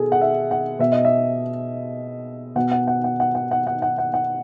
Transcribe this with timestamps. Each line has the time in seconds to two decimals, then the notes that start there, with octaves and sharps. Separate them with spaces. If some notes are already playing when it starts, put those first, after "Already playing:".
Already playing: B2 G#4 A4
0.12 F#5
0.21 E5
0.51 F#5
0.79 B2 E5
0.92 D#5
1.05 E5
2.56 B2 F#5
2.71 F#5
2.88 F#5
3.04 F#5
3.20 F#5
3.35 F#5
3.51 F#5
3.67 F#5
3.82 F#5
3.98 F#5
4.14 F#5